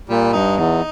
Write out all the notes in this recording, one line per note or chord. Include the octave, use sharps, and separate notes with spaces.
A#2 G3
G2 D#4
E2 D#4